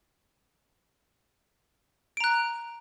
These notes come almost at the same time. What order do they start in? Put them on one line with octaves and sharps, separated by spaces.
D7 A#5 F#6